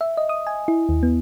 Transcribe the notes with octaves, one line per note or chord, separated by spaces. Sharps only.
E5
D#5
D#6
G#5
E4
D#2
B3